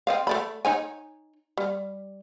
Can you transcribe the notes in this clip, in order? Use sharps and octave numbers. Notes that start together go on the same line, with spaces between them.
C4 D#5 F5
A3 D5 B5
D#4 C#5 G#5
G3